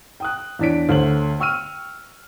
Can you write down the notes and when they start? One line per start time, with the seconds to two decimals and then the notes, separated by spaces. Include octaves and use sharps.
0.20 G5 D#6 F#6
0.59 E2 E3 D4 C#5 B6 D7
0.89 D2 A3 C5 C#5 F#7
1.40 G5 C#6 E6 F6 D#7